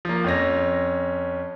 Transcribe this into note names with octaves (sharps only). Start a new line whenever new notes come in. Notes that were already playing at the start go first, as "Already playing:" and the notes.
F3 A#3
F2 C#4 A#6